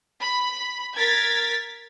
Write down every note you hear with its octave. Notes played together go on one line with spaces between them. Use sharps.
B5
A#4 G#6 A6 B6